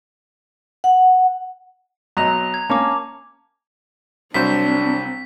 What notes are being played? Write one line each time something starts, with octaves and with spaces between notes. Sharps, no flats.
F#5
B1 F#3 D#5 A#5 F7
G#6
A#3 C#4 A5 D6
C2 F#3 C4 D4 C5 B6